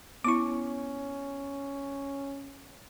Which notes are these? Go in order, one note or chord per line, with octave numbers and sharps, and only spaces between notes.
B3 C#4 E4 C#6 D6